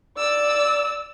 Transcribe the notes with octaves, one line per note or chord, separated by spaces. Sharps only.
D5 E6